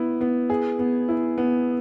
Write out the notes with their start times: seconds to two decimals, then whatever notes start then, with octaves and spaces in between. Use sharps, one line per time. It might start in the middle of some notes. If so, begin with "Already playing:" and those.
Already playing: B3 E4
0.21 B3
0.50 G#4
0.79 B3
1.09 E4
1.38 B3